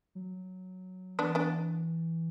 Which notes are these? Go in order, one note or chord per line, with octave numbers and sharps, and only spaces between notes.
F#3
E3 B3 D4
B3 D4